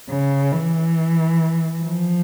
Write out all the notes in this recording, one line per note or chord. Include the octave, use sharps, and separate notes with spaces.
C#3
E3
F3